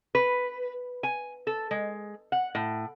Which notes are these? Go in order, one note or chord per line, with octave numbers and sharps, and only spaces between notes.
B4
G#5
A4
G#3
F#5
A2